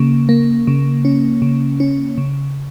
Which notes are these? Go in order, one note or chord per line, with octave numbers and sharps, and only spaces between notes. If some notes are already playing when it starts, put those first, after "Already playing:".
Already playing: C#3 A#3
A#3
C#3
C#4
C#3
C#4
C#3